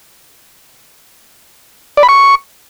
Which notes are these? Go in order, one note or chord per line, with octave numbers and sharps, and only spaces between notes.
D5
B5
C#6